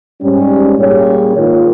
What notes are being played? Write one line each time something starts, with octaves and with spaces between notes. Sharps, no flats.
G#2 G3 C#4
A#2 G3 C#4 G#4 C#5
G#2 D#3 A#3 F4